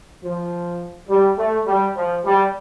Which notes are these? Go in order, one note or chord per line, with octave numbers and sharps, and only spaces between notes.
F3
G3
A3
G3
F3
G3